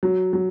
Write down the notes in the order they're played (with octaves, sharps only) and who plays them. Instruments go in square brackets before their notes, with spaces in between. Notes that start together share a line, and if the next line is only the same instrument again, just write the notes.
[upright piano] F#3
F#3